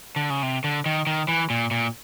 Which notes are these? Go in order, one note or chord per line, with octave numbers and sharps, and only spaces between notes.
D3
C#3
C3
D3
D#3
D#3
E3
A#2
A#2